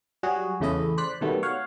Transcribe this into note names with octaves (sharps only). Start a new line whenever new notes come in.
F#3 G3 F#4 G#4
E2 C#3 A3 E4 D#5
C5 D5 F#6 B6
B2 D#3 F#3 G3 A3 B3
C#5 F5 F#5